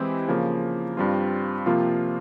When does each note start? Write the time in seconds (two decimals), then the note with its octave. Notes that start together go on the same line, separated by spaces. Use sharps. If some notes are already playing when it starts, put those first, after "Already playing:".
Already playing: E3 G#3 C4 E4 G4
0.28 C#3 F3 A#3
0.97 G2 G3 C4 F4
1.66 C3 F3 A#3 F4